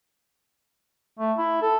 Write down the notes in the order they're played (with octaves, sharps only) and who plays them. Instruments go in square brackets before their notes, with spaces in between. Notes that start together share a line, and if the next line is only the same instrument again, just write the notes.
[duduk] A3
E4
A4